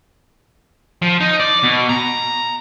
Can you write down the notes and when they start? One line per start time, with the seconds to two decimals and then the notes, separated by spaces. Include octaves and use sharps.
1.02 F3
1.20 D#4
1.40 D5
1.63 B2
1.89 A#5